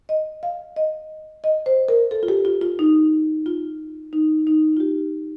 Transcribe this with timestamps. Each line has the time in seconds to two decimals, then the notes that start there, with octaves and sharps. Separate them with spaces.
0.09 D#5
0.43 F5
0.76 D#5
1.44 D#5
1.66 C5
1.89 A#4
2.11 A4
2.23 F4
2.28 G4
2.45 F4
2.61 F4
2.79 D#4
3.46 F4
4.13 D#4
4.47 D#4
4.77 F4
4.80 G4